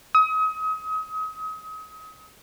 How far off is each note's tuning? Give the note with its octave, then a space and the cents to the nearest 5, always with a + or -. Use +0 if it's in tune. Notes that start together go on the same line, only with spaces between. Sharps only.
D#6 +35